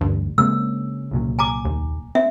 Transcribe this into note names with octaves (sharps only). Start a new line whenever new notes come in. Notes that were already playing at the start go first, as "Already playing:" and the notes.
A1 D2 G2
C#3 G#3 A#3 C4 E6
C2 A#2 F#3
G#5 A#5 D6
D#2
C4 E5